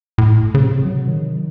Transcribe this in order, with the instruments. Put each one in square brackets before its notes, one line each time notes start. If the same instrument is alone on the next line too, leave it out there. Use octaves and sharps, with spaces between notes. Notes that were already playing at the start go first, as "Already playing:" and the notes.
[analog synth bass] A2
C#3
C3
F#3
D#3